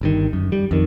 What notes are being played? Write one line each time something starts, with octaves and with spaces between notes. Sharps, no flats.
G1 G2 D#3
F#2
G3
F2 D#3